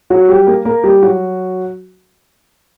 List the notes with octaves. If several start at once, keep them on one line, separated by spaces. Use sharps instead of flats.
F#3 F#4
G3 G4
A#3 A#4
A#3 A#4
G3 G4
F#3 F#4